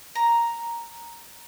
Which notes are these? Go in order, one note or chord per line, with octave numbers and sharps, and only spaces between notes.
A#5